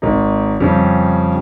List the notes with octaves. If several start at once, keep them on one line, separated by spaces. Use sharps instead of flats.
G#1 D#4
F2 C#3 G3